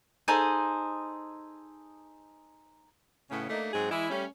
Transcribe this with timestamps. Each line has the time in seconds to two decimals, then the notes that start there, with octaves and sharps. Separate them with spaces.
0.28 D#4 G#4 A4 C5
3.31 A2 C#3 B3 C#4
3.50 A3 A#3 D4 D#4
3.73 G#2 F#3 C4 D#4 G#4
3.91 E3 G#3 E4
4.10 G3 A3 C#4